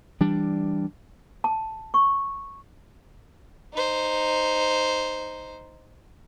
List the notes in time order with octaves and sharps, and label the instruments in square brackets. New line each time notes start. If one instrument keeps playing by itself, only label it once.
[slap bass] E3 G3 D4
[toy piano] A5
C#6
[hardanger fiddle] D#4 C5